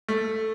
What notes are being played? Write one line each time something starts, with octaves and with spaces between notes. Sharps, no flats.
A3